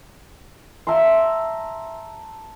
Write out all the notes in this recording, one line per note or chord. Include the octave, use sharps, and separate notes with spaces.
E5 A5 A#5 C6